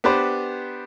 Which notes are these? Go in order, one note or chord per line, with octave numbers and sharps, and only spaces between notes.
B3 D4 G4 B4 C5